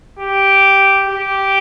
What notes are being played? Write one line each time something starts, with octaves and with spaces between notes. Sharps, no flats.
G4
G4